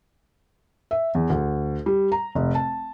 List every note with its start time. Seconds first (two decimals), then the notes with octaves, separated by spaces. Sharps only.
0.91 E5
1.15 E2
1.30 D2
1.86 G3
2.12 A#5
2.35 F1
2.55 A5